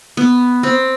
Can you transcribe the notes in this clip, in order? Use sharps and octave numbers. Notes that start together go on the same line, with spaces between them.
B3
C4